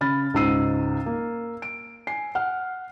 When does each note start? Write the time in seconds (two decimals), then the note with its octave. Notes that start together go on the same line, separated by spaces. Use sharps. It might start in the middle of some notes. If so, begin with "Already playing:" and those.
0.01 C#3 B5 F6 A6
0.34 C#2 G#2 C#3 E6 C7 D#7
1.06 A#3
1.62 D7
2.07 G#5 C7
2.35 F#5 F6